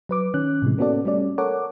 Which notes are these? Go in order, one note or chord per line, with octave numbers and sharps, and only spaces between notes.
F#3 B4 D6
D#3 C#4 F#6
A2 C3 E3 G#3
A#3 B3 C#4 F#4 A4 D5
G3 A3 C#4 D5
A4 A#4 C#5 F#5 D6